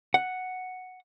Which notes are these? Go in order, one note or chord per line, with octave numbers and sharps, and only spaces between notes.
F#5